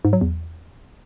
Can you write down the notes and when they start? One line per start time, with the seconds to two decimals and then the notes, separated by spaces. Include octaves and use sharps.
0.05 G#2
0.13 F#3
0.21 E2